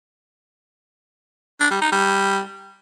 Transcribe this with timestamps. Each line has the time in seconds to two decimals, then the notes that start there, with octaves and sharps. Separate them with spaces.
1.60 D4
1.71 G3
1.81 D#4
1.92 G3